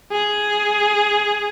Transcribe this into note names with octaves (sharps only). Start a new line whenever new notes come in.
G#4